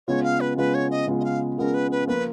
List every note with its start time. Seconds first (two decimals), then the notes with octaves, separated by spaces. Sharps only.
0.08 C#3 G#3 B3 F4 C#5
0.24 F5
0.41 B4
0.57 C#3 G#3 B3 F4 B4
0.74 C#5
0.91 D#5
1.07 C#3 G#3 B3 F4
1.20 D#5
1.24 F5
1.58 C#3 G#3 B3 F4 A#4
1.74 B4
1.91 B4
2.08 F3 A#3 F4 B4